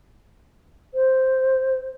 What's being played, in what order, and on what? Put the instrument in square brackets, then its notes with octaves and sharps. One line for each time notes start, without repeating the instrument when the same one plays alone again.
[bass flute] C5